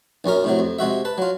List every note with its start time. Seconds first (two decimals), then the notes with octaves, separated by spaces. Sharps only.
0.24 A#1 F#2 C#4 A#4
0.44 A2 C3 F#3
0.59 F2
0.79 C3 G#3 F#4 E5
1.05 B4 A5
1.18 F#3 F4